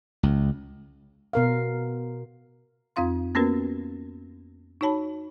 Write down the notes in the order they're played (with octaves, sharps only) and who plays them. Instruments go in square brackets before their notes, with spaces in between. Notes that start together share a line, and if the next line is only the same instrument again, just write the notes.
[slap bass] C#2
[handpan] B2 A#4 F5
[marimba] F2 C4 F4 F5 C6
A#3 B3 C#4 F#4 A#4 B4
D#4 F#4 C#5 A5 B5